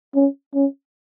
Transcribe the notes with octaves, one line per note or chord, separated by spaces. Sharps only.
C#4
C#4